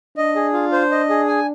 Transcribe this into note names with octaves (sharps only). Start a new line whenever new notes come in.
D4 D#5
G#4
F4
C5
D#5
G#4
G#5